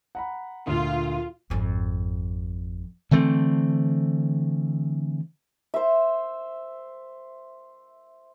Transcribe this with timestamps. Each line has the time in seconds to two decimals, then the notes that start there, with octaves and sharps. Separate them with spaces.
0.15 F#5 A#5 B5
0.67 D2 A#2 F4
1.50 G#1 F2
3.11 D3 E3 A3 C4
5.74 C5 E5